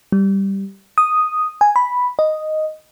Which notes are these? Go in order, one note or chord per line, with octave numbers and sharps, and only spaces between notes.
G3
D#6
G#5
B5
D#5